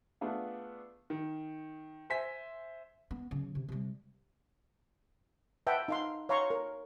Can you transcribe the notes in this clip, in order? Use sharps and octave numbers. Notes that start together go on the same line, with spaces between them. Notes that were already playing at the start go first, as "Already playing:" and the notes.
A3 B3 D4 F4 G#4
D#3
C5 E5 G#5 B6
B3
C#3 F#3
C3
C3 G3
B4 E5 F#5 G5 A5
D#4 F5 C6
C#5 F5 A#5 C6 C#6
A#4